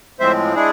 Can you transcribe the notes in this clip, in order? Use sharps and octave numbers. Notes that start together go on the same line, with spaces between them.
A2 F3 G#3 C4 C5 E5
G#3 D4 E4 G#4